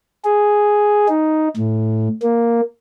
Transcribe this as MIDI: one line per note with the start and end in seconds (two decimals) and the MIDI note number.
0.25 1.07 68
1.08 1.48 63
1.57 2.08 45
2.22 2.61 58